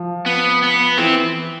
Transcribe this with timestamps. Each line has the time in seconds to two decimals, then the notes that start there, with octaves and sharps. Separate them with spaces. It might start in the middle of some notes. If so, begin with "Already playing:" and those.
Already playing: F3
0.26 B3
0.62 B3
0.98 E3 C4